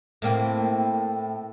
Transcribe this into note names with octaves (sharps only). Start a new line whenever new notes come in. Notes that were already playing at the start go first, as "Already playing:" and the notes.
A2 A#3 C4